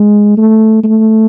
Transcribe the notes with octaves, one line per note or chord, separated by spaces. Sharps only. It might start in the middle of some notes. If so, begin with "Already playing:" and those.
Already playing: G#3
A3
A3